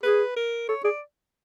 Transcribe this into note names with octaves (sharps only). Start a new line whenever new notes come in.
G#4 B4
A#4
A4 C#5
G#4 D5